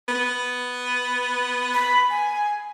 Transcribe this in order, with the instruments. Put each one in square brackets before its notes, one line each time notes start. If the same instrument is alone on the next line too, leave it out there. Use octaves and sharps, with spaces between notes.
[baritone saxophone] B3
[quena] B5
G#5